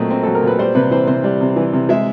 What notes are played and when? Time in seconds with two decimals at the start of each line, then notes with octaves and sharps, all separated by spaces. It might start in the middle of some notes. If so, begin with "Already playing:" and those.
Already playing: A#2 F#3 A3 C4 D#5
0.10 C4
0.23 F#3 A4
0.35 A#4
0.43 A#2 B4
0.59 G3 C5
0.75 C3 B4
0.91 E3 C5
1.07 C3 C5
1.24 G3
1.41 C3
1.56 E3
1.73 C3
1.89 G#3 E5